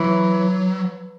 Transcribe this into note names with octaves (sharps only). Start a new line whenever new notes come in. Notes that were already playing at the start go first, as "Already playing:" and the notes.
Already playing: E3 F#3